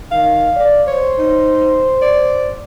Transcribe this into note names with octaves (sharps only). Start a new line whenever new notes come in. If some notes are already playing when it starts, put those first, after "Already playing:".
D#3 F5
D5
C5 C#5
D#4
D5